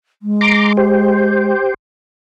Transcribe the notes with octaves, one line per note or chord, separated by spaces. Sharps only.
G#3
A#5 C6 D6
G4 C5